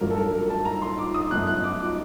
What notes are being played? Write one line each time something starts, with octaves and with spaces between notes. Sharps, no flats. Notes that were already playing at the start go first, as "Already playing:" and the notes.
A1 G2 F#3 A#4
A4
A#4
A#4
A5
A#5
C6
D6
D#6
G1 F#2 F#3 A3 F#6
F#6
D6
D6